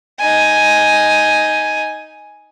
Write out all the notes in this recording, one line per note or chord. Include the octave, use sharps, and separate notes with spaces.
D#4 G#5